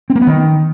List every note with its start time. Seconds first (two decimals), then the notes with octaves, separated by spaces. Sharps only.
0.10 C4
0.15 A#3
0.21 B3
0.27 D#3